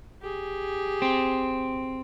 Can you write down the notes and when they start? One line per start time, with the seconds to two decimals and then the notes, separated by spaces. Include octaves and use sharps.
0.22 G4 G#4
1.02 C4